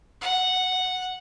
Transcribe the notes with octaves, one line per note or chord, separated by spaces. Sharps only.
F#5